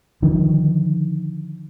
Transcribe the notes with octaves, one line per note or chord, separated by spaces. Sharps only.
D3 D#3 F3